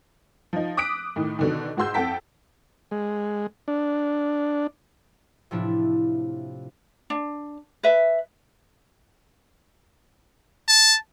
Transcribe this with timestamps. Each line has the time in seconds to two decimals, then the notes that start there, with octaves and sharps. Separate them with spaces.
0.53 F3 D#4
0.77 D6 D#6 F#6 B6 D7
1.16 A2 D#3
1.39 B2 D3 D#3
1.77 G#2 F#4 G#4 C6 E6 G6
1.94 F2 A4 F#5 G5 A5 B6
2.91 G#3
3.68 D4
5.51 A2 C3 F3 D4 E4
7.10 D4
7.83 B4 E5
10.68 A5